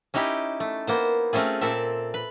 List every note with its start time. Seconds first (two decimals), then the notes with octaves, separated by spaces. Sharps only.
0.14 C#4 D#4 E4 G4
0.60 A3
0.87 A#3 B3 C5
1.33 A3 C4 C#4 F4 G#4
1.61 A#2 C4 A4 E5
2.14 B4